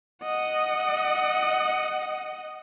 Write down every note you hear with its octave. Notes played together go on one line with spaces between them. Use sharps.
D#5 F#5